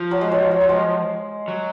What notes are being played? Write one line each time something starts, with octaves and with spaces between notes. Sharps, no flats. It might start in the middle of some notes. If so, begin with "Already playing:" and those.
Already playing: F3
F#3
G#3
F#3
F#3
F#3
G#3
F#3